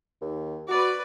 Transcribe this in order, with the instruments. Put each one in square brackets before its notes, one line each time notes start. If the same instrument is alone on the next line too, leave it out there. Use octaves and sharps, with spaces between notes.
[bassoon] D#2
[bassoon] F#4 [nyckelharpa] B4 D5